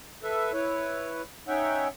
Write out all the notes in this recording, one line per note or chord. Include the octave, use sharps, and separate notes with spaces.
A4 B4 E5
E4 B4 C#5
C#4 D#4 C#5 E5 F#5 G5